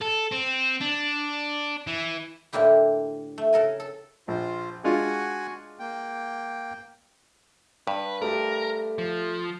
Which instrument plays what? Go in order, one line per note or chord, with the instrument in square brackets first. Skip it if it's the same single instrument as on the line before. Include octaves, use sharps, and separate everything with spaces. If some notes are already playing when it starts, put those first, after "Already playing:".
[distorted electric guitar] A4
C4
D4
E3
[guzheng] A2 D3 A#3 E4 G4
A3
C#3 A4 A#4 G#5
A4
[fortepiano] A#1 [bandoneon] F4 C5
[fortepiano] G#3 D4 F4 [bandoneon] F#4 F#5 G#5
[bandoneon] A#3 G5
[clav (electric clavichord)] G2 [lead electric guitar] B4
[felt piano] A3 G4 A4 [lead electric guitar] A#4
[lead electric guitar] F3